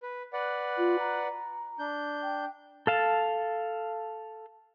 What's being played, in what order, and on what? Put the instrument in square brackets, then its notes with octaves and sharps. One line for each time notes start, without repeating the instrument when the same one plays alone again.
[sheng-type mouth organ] B4
B4 D5 F#5
[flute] F4
A#5
[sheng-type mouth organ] D4 G6
[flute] G5
[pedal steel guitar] A4 F5 A5